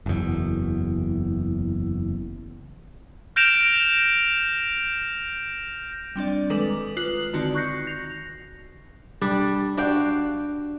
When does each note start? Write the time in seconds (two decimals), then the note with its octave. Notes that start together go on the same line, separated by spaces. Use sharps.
0.06 F#1 E2
3.36 F6 G6 A#6 D7 E7 F7
6.16 G3 C4 D4 D5
6.50 D#3 G#3 A4 B4 D6
6.97 F4 B4 D#6 F#6 C7 F#7
7.33 D3 D#3 C4 D#4 F#4 D5
7.55 C#6 F#6 G6 A#6 C7 C#7
7.87 A#6 F7
9.21 G3 D4
9.77 D4 F#4 F5 G5